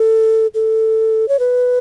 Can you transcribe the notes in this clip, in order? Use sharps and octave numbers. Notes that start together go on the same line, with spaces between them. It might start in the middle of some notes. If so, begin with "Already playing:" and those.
Already playing: A4
A4
C#5
B4